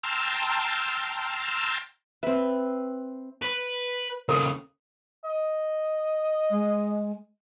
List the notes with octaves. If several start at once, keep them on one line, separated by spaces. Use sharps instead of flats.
G5 A5 A#5 C6 E6 F6
C4 B4 E5
B4
D#2 C#3 A4 A#4
D#5
G#3